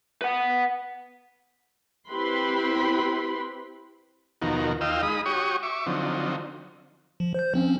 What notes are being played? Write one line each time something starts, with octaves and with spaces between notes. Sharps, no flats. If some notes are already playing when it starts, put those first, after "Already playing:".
B4 F#5
C4 E4 G4 B4 B5 C6
D#2 B2 D#3 F3 F#4 A#4
D#2 F4 D#5 F5 G5 E6
G#3 D#4 B5 D#6
F#4 G4 C#5 C#6 D#6
E5 C#6 D6
D3 F3 F#3 C4 D#4
F3
C5 G6
F3 C4 C#4